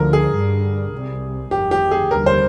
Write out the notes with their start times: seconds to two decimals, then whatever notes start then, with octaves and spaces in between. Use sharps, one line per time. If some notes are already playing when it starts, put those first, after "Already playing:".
Already playing: D2 D3 F3 A#4
0.13 G#4
0.33 G2 D3 G3
0.92 C2 C3 G3
1.51 G1 F2 D#3 G4
1.71 G4
1.91 G#4
2.11 F1 D#2 D3 G3 A#4
2.26 C5